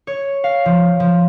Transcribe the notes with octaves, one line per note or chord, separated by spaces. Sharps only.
C#5
F5
F3
F3